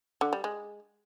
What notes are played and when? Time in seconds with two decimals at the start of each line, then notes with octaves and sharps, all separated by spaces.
0.21 D3
0.33 G3
0.44 G#3